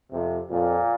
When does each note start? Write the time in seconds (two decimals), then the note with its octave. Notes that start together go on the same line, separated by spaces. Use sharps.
0.12 F2 C3
0.50 F2 A#2